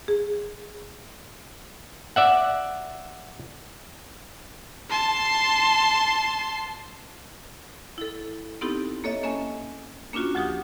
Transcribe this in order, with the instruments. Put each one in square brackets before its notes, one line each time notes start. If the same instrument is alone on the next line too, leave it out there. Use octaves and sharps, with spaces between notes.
[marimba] G#4
[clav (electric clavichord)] D5 E5 F#5
[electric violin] A5 C6
[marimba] E4 A4
B3 C4 D#4 E4 G4 A4
A#3 A4 C#5 D#5 E5
A#3 C#4 D#5 G#5 A5
A#3 C#4 D4 F4 F#4
D2 F3 G4 D#6